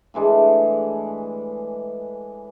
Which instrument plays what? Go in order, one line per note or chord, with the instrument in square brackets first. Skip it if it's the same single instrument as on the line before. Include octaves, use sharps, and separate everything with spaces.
[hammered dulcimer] A2 E3 G#3 D4